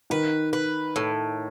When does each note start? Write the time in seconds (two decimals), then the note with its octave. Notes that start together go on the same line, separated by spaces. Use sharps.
0.10 D#3 B4
0.53 B4
0.96 A2